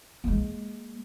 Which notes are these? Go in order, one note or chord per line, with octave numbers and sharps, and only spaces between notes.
G#3 A#3